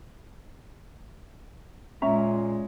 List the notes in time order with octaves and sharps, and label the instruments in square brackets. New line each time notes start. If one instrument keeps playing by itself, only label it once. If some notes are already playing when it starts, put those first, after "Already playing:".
[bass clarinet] A#2 [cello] G#3 [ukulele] C#4 E5 A#5